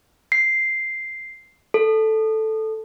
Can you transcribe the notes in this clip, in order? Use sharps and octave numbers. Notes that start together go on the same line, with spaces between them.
C7
A4